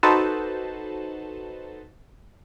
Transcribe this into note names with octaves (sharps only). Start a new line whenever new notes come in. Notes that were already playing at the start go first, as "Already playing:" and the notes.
D#4 F#4 A4 B4 C5 A5